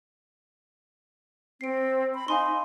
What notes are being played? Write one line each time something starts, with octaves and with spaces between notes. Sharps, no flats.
C4 C7 D7
B5
D#4 F5 G#5 C6